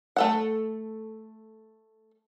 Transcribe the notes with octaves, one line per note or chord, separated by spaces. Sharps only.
A3 A4 F#5